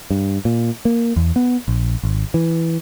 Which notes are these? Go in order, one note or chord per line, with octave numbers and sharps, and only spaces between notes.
G2
A#2
A#3
E2
B3
A#1
G#1
E3